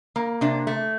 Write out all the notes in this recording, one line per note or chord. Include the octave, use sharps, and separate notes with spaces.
A#3
C3 D4
A3